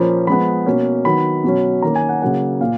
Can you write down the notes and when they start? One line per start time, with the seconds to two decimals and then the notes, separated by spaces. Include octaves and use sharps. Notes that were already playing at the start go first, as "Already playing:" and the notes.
Already playing: A#2 F3 A#3 C#4 B5
0.27 F3 G#3 B3 B5
0.66 B2 A#3 C#4
1.05 D#3 F#3 B3 B5
1.44 B2 F#3 C#4
1.82 D#3 A#3 C#4 A#5
1.96 G#5
2.09 F#5
2.22 C#3 F#3 A#3 F#5
2.61 A#2 F5